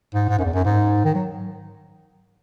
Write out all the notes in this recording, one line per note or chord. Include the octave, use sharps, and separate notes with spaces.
G#2
G#2
F#2
E2
F#2
G#2
D#3
F#3